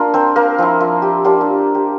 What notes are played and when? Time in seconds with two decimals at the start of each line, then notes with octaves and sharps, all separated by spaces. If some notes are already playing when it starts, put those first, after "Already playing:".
Already playing: A#3 D4 F4 A#4
0.14 C4 C5
0.36 A#3 A#4
0.58 F3 C4 E4
0.80 F4
1.02 G4
1.24 A#3 D4 F4 G4
1.41 G4
1.75 G4